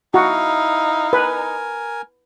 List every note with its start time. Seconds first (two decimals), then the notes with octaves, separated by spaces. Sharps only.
0.14 D#4 E4 F#4 F5
1.13 A#4 B4 G#5